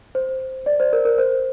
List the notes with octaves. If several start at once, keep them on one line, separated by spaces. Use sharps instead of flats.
C5
D5
C5
A#4
A#4
C5